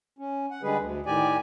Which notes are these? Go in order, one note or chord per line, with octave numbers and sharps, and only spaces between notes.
C#4
F#5
D3 G3 G#3 G#4 B4
D2
A2 D#3 G4 D5 G#5